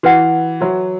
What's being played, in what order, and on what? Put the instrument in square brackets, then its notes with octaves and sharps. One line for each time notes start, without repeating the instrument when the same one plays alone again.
[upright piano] E3 [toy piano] F#4 B4 F#5
[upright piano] F#3 [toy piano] F#4 B4 E5